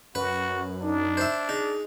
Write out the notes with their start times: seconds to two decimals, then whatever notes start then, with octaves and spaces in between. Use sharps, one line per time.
0.15 F#2 F#4 B4
0.81 D4 D#4
1.17 C5 E5
1.49 D#4 G#4